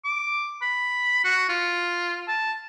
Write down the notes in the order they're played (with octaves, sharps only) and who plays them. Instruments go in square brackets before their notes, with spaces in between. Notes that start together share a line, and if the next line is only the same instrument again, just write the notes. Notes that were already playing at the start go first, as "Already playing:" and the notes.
[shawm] D6
B5
F#4
F4
A5